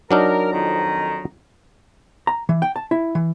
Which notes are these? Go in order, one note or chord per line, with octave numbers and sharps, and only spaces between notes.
F#3 D4 D#4 A#4
F2 D#3 A#5
A#5
E3
G5
A5
E4
E3